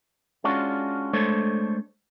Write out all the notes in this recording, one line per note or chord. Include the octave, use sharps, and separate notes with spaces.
G#3 C#4 D4 F4 F#4
G#3 A3 D4 A4 C5 C#5